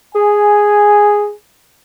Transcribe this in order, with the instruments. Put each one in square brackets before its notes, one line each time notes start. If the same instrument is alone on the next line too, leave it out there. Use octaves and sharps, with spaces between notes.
[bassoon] G#4 [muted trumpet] G#5